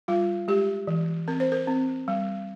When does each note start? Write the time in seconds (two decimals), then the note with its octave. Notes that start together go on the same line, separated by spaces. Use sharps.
0.08 G3 F4
0.48 G#3 G4
0.87 E3
1.28 C4 A#4
1.40 C5
1.52 A#4
1.68 C4
2.08 G3